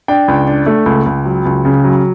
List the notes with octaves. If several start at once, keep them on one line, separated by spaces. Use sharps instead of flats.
D4 G5
C#2
D4
A3
C#2
C#2
F#3
C#2
C#3
F#3